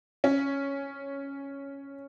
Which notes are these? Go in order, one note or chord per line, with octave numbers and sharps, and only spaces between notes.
C#4